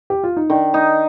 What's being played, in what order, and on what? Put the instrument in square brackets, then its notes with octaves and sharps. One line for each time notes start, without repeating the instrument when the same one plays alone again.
[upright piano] G4
F4
D#4
[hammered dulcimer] D#3 [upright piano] D4
[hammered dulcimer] D#4